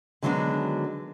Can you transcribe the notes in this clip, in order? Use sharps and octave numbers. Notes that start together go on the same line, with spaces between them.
D3 D#3 F#3 G#3 B3 D4